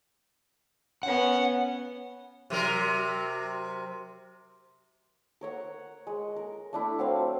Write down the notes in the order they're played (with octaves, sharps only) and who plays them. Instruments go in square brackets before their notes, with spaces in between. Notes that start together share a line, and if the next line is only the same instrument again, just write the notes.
[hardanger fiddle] B3 C#4 [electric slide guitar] F#5
[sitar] C3 F#3 A#4
[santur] A#4 C#5 F#5
G#3
A#4
A3 D4 E4
F#3 C4 F5